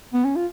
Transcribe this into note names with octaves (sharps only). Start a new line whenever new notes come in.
B3
C#4
F4